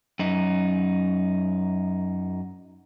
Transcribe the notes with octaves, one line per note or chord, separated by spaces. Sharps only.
F#2 D#4